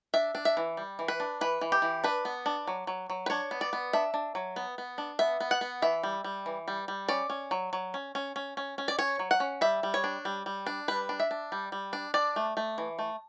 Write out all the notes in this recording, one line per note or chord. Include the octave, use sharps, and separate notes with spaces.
D4 E5
D4
E5
E3
G3
E3
B4
D4
E3 B4
E3
G4
E3
D4 B4
B3
D4
F#3
F#3
F#3
B4
D4 C#5
B3
D5
B3
D4 E5
D4
F#3
B3
B3
D4
B3 E5
B3
F#5
B3
E3 E5
G3
G3
E3
G3
G3
C#4 D5
C#4
F#3
F#3
C#4
C#4
C#4
C#4
C#4
D5
C#4 C#5
F#3
F#5
C#4
G3 E5
G3
C#5
D4
G3
G3
D4
G3 B4
D4
E5
D4
G3
G3
D4
D4 D5
A3
A3
E3
A3